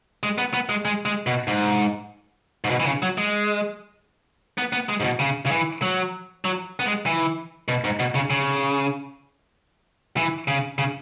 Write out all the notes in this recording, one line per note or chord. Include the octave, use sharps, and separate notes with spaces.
G#3
B3
B3
G#3
G#3
G#3
B2
G#2
G#2
B2
E3
C#3
F#3
G#3
B3
B3
G#3
G#2
B2
C#3
C#3
E3
F#3
F#3
B3
G#3
E3
B2
G#2
B2
C#3
C#3
E3
C#3
C#3